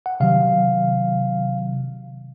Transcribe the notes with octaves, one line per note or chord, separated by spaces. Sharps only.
F#5
C3 D#3 F#3 F5